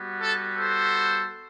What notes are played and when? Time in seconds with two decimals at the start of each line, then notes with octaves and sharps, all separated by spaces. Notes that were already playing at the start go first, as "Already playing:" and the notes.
Already playing: G3 B3 F#4
0.20 A4
0.57 A4 C5